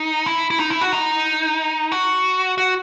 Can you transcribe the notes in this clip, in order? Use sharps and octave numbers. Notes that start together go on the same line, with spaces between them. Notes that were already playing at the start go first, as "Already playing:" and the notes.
Already playing: D#4
E4
E4
D#4
E4
F#4
D#4
F#4
F#4